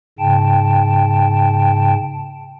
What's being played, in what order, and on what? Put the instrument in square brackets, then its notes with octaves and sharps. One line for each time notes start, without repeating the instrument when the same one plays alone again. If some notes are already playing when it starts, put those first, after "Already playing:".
[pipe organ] G#2 C#3 G5 A5